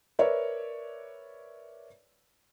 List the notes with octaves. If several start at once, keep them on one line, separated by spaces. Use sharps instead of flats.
A#4 B4 C#5 D5 E5